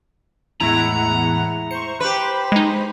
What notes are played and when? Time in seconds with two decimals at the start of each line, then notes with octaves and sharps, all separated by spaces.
0.60 E2 A2 G#3 E4 F#5 A#5
1.71 C5 C#6 C#7
2.00 G4 B4 C5 B5
2.52 G#3 D#4